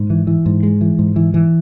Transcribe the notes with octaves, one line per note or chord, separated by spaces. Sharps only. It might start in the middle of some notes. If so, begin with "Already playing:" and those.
Already playing: G#2
E3
E3
G#2
G#3
E3
G#2
E3
E3